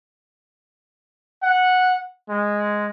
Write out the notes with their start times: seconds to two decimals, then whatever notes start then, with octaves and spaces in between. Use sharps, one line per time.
1.43 F#5
2.29 G#3